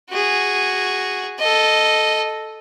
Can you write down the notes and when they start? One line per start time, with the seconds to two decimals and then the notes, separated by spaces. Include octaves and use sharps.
0.10 F#4 G#4
1.39 A4 D#5